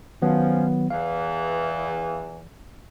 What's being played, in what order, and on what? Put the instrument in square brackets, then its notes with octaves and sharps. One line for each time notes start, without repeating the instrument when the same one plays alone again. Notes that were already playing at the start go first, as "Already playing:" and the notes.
[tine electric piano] D#3 F#3 B3 [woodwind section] F3 C#4
[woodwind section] E2 E3 [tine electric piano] F5